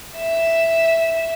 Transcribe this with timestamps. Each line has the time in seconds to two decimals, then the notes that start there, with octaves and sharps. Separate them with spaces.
0.18 E5